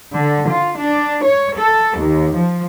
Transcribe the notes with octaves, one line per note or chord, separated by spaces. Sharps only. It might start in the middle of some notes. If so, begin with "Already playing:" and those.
D3
F4
D4
C#5
A4
D#2
F3